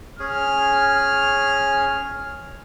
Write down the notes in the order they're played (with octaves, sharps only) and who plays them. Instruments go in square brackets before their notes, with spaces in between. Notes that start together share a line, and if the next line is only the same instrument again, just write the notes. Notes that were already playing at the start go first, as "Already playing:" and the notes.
[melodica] C#4 G#4 [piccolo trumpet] F6